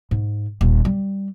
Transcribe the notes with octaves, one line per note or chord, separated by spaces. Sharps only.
G#2
D#1
G3